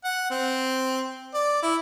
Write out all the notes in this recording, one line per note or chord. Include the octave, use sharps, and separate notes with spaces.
F#5
C4
D5
E4